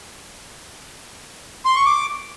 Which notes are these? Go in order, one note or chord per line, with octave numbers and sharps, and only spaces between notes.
C6
C#6
D6